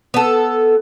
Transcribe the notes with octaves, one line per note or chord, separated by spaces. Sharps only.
B3 A4